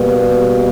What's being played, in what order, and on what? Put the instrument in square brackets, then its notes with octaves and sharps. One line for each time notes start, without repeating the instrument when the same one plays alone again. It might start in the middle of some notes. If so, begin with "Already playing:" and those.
Already playing: [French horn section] B2 G3 A#3